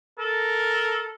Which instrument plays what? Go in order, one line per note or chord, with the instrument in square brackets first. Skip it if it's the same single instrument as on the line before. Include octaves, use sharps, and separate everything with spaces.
[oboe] A4 [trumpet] A#4